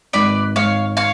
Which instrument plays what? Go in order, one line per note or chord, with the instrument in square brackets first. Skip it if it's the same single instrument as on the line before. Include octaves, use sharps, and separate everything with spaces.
[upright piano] G#1 [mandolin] B4 D5
[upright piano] G#1 [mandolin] C#5 F5
[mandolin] C#5 F5